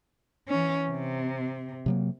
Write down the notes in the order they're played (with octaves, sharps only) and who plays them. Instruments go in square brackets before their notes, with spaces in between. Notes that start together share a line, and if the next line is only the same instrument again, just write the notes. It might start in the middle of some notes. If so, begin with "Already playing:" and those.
[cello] E3 C#4
C3
[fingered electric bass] C3 F#3 A#3